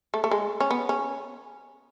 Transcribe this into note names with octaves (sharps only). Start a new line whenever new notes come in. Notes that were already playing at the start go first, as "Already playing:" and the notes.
A3
A3
G#3
C#4
B3
C#4